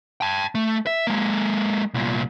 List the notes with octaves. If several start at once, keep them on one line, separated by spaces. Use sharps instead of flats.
G5 A5
A3
E5
G#3 A#3
C2 A#2